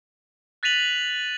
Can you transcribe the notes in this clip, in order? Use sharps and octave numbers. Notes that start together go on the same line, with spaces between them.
F#6 A6 B6 D#7 F7 F#7